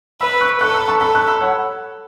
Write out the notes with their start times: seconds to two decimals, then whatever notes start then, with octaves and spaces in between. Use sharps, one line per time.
0.21 B4 B5 E6
0.41 C#6 F#6
0.61 A4 C#6 F#6
0.74 B5 E6
0.88 A5 C#6
1.01 A4 B5 E6
1.14 C#6 F#6
1.28 B5 E6
1.41 C#5 F#5